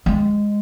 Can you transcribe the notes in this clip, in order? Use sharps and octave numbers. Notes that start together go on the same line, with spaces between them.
G#3